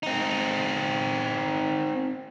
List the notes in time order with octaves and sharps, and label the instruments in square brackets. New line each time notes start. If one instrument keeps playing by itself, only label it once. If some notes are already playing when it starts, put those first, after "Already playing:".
[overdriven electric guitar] C4 D#4